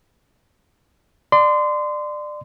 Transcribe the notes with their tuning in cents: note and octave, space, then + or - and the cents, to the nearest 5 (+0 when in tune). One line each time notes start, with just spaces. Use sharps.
D5 +25 C6 -25